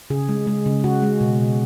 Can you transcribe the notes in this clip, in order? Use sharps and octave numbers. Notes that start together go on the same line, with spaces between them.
C#3 G#4
G#3
G#3
C#3
C#3 F#4
G#3
B2
B2